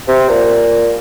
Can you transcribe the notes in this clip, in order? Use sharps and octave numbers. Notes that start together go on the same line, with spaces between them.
C3
A#2